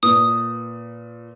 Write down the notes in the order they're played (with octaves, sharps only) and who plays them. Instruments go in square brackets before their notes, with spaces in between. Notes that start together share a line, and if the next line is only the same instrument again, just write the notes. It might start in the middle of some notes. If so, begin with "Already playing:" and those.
[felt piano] A#2 B4 [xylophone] D#6